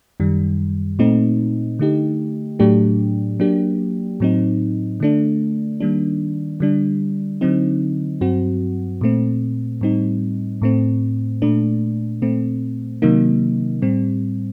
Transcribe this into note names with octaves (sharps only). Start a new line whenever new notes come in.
F#2 D#3 G3
A#2 A3 C4 D#4
D3 A3 D#4 G4
A2 F#3 A3 D4 G4
F#3 A#3 D4 G4
A2 F#3 C4 D#4
D3 A3 D4
D#3 G3 A#3 D4
D3 G3 D4
D3 F#3 C4 D#4
G2 F#3 C4 F#4
A#2 A3 C4
A2 G3 C4 D#4
A2 A3 C4
A#2 A3 D4
A#2 A3 C4
C3 D#3 F#3 A#3 D#4
A2 G3 C4